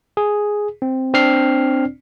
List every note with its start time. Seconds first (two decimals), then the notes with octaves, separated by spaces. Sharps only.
0.17 G#4
0.82 C4
1.14 C4 D4 D5 F6 C7